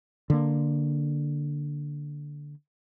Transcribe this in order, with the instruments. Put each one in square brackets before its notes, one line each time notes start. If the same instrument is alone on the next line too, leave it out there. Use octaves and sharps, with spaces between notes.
[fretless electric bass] D3 A#3